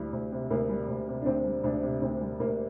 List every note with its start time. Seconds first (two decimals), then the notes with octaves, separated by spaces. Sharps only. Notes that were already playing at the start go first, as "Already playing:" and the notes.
Already playing: D2 G3 E4
0.13 D2
0.32 C3
0.50 D2 A#3
0.69 G3
0.88 D2
1.08 C3
1.22 D4
1.26 D2 C4
1.45 G3
1.63 D2 D4
1.83 C3
2.02 D2 C4
2.21 G3
2.39 D2 A#3